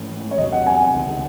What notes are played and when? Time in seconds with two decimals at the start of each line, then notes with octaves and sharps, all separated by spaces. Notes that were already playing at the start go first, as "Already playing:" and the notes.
Already playing: G#2 E3 A3 C#4
0.31 C#5
0.38 E2 C3 F#3 D#5
0.52 F#5
0.67 G#5
0.95 C#2 C3 D#3